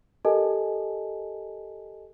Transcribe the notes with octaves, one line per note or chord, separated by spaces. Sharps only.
G4 A4 A#4 D#5 G#5 A5